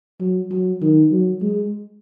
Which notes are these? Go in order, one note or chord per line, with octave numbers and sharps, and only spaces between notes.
F#3
F#3
D#3
F#3
G#3